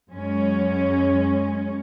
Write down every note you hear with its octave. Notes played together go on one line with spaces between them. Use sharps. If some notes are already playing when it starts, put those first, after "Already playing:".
F#2 G#3 C#4